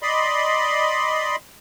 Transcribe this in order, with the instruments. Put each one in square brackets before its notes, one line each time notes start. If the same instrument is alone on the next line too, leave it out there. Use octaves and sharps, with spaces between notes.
[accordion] D5 D#5 B5 C6